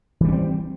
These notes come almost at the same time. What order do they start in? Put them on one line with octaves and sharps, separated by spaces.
E3 G3 C#4 C4